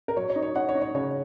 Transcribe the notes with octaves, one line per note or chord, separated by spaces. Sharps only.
A#4
F#3 C#5
C#5
D#4
C#5
D#4 C#5 F#5
C#5
D#4
C#5
C#3 C#5